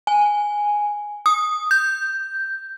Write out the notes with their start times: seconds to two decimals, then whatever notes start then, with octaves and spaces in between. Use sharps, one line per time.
0.07 G#5
1.26 D#6
1.71 G6